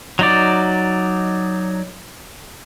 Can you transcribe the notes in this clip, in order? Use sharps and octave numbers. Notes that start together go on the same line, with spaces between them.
F#3 D#4 D5